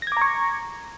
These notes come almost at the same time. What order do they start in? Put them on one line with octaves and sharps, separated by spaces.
A#6 G#6 D6 A#5 C#6